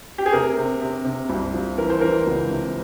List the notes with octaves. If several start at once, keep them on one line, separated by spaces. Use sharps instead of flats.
G4
G#4
C3 A#4
C3
C3
C3
C2
F3
E3 A#4
C5
E3 A#4
C#2
C3